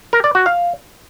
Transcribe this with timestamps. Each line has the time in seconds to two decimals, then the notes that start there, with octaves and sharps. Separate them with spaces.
0.13 A#4
0.24 D5
0.35 F#4
0.46 F5